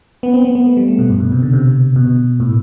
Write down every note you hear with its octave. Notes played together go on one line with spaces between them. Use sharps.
B3
C4
B3
B3
A3
G3
A3
B2
G2
B2
C3
D3
C3
B2
A2